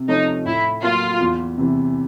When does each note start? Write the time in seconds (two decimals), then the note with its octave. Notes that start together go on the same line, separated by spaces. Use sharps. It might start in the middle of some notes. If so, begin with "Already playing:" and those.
Already playing: C3
0.08 F3 A3 C#4 D#4 F4
0.45 A2 E4
0.83 F#3 A#3 F4
1.20 E2
1.58 C3 E3